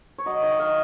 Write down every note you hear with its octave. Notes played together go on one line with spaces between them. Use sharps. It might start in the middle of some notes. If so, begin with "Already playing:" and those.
C#5
F#3 D#5
D#3 C#5
D#3 F5